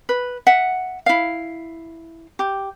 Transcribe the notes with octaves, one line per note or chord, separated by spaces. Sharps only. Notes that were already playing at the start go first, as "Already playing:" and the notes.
B4
E5 F#5
E4 F5
G4